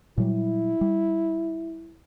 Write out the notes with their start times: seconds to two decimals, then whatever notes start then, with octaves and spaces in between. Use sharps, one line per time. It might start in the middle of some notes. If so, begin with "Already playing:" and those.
0.18 A#2 F#3 G3 E4
0.81 G3